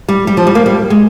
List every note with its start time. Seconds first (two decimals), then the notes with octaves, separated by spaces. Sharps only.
0.08 G3
0.27 G3
0.37 F3
0.47 G3
0.55 A#3
0.66 G3
0.90 G#3